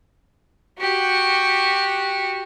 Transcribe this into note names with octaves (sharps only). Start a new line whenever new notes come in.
F#4 G4